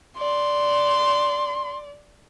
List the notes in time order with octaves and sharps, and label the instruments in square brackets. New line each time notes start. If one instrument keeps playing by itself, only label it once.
[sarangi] D5 [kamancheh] C6